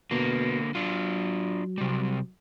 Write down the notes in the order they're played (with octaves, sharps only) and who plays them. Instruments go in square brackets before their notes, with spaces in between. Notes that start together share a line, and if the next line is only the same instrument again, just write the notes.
[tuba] B2 [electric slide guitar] D3 A#3
[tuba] F#3 [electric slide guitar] D4 F4
[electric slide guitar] C3 G3